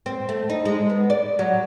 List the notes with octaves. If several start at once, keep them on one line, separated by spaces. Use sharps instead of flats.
C4
A3
D#4
G#3
B3
D5
F#3